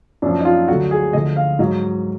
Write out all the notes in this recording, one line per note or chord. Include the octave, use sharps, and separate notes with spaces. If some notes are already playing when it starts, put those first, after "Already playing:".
F#2 F3 D4
D#4
F4
D2 D3 F#3 F#4
G#4
D2 D3 F3 D#5
F5
G#2 F#3 D#5